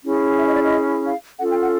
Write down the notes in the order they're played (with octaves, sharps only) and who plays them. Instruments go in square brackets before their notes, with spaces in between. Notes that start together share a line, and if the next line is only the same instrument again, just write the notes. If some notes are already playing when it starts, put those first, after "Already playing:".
[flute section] C#4 E4 G#4
E5
D#5
D5
D#5
F5
C#4 F4 A4 F#5
G5
F#5